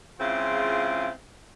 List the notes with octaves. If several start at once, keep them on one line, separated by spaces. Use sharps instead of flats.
C#3 G#3 C4 E4 F4